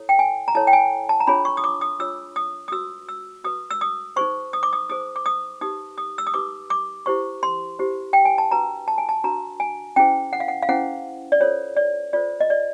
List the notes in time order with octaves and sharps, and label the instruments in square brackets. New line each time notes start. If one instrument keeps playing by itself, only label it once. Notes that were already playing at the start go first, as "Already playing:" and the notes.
Already playing: [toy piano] E4 A4 C#5
G5
G#5
A#5
E4 A4 C#5 A5
G5
G#5
A5
A#5
D4 F4 G#4 C#5 B5
C#6
D#6
D6
D#6
D4 F4 G#4 C#5 E6
D#6
D#6
F#4 B4 E6
E6
F#4 B4 D#6
E6
D#6
D#4 G#4 C5 C#6
D#6
D6
D#6
D#4 G#4 C5 D#6
D6
D#6
D#4 G4 B4 D#6
D#6
E6
D#6
D#4 G4 B4 D6
D6
E4 G4 C5 C#6
C6
E4 G4 C5
G5
G#5
A5
D4 F#4 B4 A#5
A5
G#5
A5
D4 F#4 B4 A#5
G#5
C#4 E4 G#4 C5 G5
F#5
F5
F#5
F5
C#4 E4 G#4 C5 F#5
D5
F4 A4 C5 C#5
D5
F4 A4 C5 D5
D#5
D5